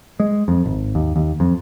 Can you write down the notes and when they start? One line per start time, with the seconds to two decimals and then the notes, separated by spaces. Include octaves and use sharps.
0.20 G#3
0.48 F2
0.66 G#1
0.95 D#2
1.16 D#2
1.40 F2